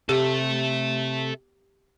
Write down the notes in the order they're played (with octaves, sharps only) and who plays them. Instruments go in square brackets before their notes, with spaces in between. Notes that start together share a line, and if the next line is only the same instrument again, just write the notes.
[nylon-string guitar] C3 [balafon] G4 [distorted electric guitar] A4 E5